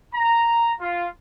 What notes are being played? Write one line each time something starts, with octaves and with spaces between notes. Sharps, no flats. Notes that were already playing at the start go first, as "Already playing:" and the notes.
A#5
F4